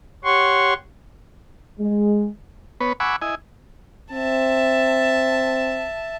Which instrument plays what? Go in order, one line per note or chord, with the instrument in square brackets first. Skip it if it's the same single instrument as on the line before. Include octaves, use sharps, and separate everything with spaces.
[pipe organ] G4 C#5 F#5 C6 C#6
[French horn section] G#3
[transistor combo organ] B3 B4 C#5
F#5 G#5 B5 C#6 D6 E6
E4 D#5 G#5
[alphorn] C4 [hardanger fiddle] E5 A5